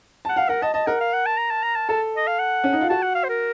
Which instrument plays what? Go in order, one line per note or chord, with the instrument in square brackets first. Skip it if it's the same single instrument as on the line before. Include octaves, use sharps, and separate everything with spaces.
[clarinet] F#5 [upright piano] A5
[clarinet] F5 [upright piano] F#5
[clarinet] A#4 [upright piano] F#5
[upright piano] D#5 [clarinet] A5
[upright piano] D#5 [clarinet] A5
[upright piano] A#4 [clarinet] F#5
[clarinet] F5
F#5
A5
A#5
A5
A#5
A5
[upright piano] A4 [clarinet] A5
[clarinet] D#5
F5
F#5
[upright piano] C#4
D#4
F4
[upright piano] F#4 [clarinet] A5
[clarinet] F#5
F5
C5
A#4